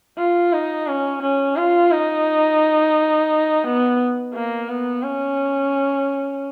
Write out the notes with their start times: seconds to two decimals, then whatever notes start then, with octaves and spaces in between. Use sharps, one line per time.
0.18 F4
0.53 D#4
0.87 C#4
1.22 C#4
1.57 F4
1.92 D#4
3.64 B3
4.34 A#3
4.69 B3
5.03 C#4